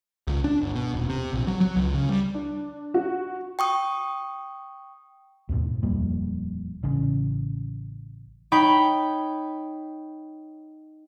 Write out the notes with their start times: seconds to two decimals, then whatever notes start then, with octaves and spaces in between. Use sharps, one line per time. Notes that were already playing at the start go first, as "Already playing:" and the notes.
0.27 C#2
0.44 D4
0.62 G1
0.75 B2
0.94 D#1
1.09 C3
1.33 A#1
1.47 F#3
1.60 F#3
1.76 C#2
1.94 C#3
2.09 G3
2.34 D4
2.94 F#4
3.59 G5 C#6 D#6
5.49 D#2 G#2 B2
5.83 D#1 F2 G3 A#3
6.83 A1 C#3
8.52 D#4 C#5 G5 B5